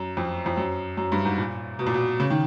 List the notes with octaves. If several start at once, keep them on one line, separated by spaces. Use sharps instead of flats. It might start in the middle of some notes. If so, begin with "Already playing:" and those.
Already playing: F#2
F2
F2
F#2
F#2
G2
G#2
A#2
B2
A#2
B2
C#3
D#3